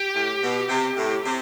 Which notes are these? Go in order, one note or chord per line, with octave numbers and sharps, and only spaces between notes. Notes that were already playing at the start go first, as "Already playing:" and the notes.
Already playing: G4
A2
B2
C3
A2
C3